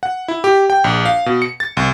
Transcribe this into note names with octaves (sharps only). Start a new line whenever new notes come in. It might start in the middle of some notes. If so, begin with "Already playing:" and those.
F#5
E4
G4
G5
A#1
F5
B2
C#7
A6
C2